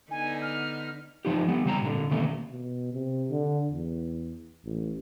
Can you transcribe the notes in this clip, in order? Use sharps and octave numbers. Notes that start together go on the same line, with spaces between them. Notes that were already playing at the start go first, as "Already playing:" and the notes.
D3 B3 D#4 G#5
F6
F3 D#4 G4
G3 B3
C#3 G3 A#5
A#2 D3
B2 D#3 A3 A#3 C#4
B2
C3
D3
E2
A1